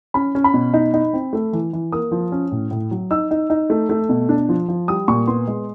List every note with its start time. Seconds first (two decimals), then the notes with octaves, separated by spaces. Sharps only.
0.14 C#4 B5
0.35 C#4
0.44 B5
0.54 B2
0.74 D#4
0.94 D#4
1.13 C4
1.33 A3
1.53 E3
1.73 E3
1.92 A#3 D#6
2.11 F3
2.32 C#4
2.52 A2
2.71 A2
2.91 F#3
3.11 D#4 E6
3.31 D#4
3.50 D#4
3.70 A3
3.89 A3
4.09 B2
4.29 D4
4.49 F3
4.68 F3
4.88 G3 D#6
5.08 A#2 C#6
5.27 B3 C6
5.47 G#3